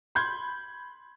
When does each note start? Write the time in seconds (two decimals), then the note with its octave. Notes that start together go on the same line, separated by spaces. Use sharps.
0.15 B5 C6 G6 G#6